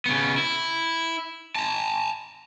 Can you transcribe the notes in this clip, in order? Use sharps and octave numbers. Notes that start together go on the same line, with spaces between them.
C#3 B3
E4
A5 A#5